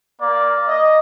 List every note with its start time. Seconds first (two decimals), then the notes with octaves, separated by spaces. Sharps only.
0.20 A#3 D5
0.67 D#5